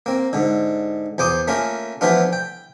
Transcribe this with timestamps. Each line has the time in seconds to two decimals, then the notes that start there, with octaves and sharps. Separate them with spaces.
0.06 A#3 C4
0.33 G#2 D3
1.18 E2 C5 D6 D#6
1.48 A3 A#3 C#4 F4
2.01 E3 F3 A3 B3 D4 F4
2.33 G5